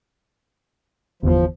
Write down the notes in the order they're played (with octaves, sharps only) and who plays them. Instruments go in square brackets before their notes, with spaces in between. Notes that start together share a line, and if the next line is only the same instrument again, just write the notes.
[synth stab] G1 E2 [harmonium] F3